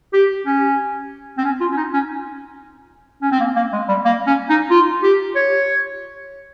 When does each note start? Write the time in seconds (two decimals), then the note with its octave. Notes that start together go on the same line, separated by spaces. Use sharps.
0.13 G4
0.46 C#4
1.38 C4
1.45 C#4
1.61 F4
1.72 C#4
1.77 D#4
1.93 C#4
3.22 C#4
3.31 C4
3.40 A#3
3.56 A#3
3.73 G#3
3.88 G3
4.05 A#3
4.27 C#4
4.49 D#4
4.70 F4
5.03 G4
5.36 C#5